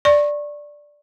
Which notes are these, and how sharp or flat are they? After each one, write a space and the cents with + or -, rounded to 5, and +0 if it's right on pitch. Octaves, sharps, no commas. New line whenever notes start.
D5 +0 C#6 -25